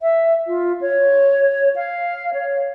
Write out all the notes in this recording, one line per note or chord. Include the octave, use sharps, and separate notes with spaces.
E5
F4
C#5
F5
C#5